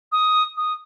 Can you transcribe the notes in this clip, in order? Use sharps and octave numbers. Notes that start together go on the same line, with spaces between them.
D#6
D#6